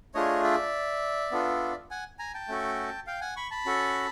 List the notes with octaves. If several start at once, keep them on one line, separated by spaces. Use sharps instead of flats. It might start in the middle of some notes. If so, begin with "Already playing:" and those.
A3 D4 F4 G#4 C#5 D#5
D5 E5
B3 D4 F4 A4
F#5 G#5
G#5 A#5
G5 A5
A3 C#4 F#4 A4
F5 G5
F#5 G#5
B5 C#6
A5 B5
C#4 F#4 A4